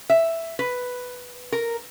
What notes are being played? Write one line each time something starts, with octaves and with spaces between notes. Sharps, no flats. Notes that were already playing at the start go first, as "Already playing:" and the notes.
E5
B4
A#4